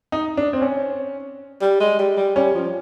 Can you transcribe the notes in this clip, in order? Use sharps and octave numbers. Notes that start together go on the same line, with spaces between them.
D#4
D4
C4
C#4
G3
G#3
G3
G3
G3 C#4
F3